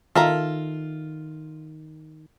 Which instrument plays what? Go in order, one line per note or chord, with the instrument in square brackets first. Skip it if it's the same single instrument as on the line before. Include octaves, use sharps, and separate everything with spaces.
[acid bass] D#3 [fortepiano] F4 [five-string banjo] A4 E5 A#5